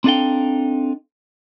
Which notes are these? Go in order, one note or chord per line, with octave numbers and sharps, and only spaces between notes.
C4 D4 D#4 A4 F5 G5